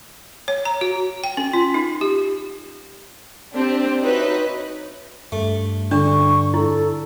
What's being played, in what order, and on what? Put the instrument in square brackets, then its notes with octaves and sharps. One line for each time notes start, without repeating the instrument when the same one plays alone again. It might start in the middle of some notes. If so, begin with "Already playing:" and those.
[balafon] C#5
A#5
F#4
G5
C#4
F4
D#4
G4
[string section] C4 D4 G4
D#4 F#4 B4 C#5 D#5 E5
[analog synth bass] G2 [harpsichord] A3
[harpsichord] D3 [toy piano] D4 [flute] C#6
[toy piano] E4 [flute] A4